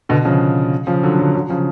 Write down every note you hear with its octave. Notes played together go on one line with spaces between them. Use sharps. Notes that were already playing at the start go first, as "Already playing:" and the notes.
B2 D3
C#3 F3
C#3 F3
D3 F#3
D3 F#3
D3 F#3
C#3 F3